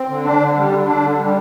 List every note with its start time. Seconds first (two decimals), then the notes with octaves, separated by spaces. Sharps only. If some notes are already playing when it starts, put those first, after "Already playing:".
Already playing: C4
0.09 D3
0.25 D4
0.40 D3
0.56 G3
0.72 D3
0.87 D4
1.02 D3
1.18 G3